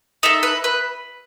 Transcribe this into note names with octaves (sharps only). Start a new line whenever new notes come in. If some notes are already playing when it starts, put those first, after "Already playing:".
D#4 A4 E5
B4
B4